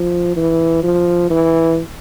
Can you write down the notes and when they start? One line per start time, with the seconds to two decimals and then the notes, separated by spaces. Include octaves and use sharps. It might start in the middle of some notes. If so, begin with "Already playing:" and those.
Already playing: F3
0.36 E3
0.83 F3
1.30 E3